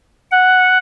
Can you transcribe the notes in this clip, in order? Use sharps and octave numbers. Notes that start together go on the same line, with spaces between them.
F#5